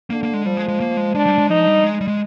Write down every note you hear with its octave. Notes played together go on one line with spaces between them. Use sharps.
D3 A#3
A#3
G#3
F3 G3
G#3
G#3
A#3
G#3
G#3 D4
G3
G#3
F3 D#4
G3
G#3
G3
G#3